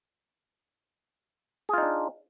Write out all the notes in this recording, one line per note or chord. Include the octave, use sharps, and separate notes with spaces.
D4 D#4 F4 G#4